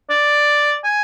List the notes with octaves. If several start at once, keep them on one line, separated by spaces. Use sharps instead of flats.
D5
G#5